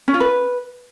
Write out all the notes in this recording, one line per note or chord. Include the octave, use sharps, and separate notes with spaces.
C#4
F4
B4